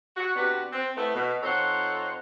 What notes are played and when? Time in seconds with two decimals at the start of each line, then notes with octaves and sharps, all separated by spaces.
0.16 F#4
0.36 C3 B3 D4 F#4 G4 B4
0.71 C4
0.96 A3 B3 E4
1.13 B2
1.43 F2 D#4 A4 C5 C#5 F#5